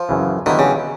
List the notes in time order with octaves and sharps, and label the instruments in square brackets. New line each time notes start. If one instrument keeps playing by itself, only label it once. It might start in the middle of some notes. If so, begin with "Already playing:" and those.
Already playing: [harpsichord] F3
[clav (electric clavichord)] F#2 C#3 E3
[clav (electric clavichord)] D3 F#3 B3 E4 G4 [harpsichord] D#3
[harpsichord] C#3